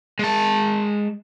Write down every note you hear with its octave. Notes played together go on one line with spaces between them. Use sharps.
G#3 A5